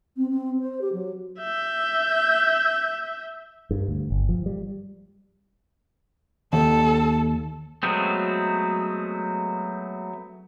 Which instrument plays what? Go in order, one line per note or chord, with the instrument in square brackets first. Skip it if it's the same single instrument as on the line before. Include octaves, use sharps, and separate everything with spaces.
[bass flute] C4
C4
C5
G4
F#3
[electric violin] E5 G6
[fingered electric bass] G2
D2
G1
F3
G3
[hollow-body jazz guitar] D#2 [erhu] A4
[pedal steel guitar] F#3 G#3 A3 B3 C4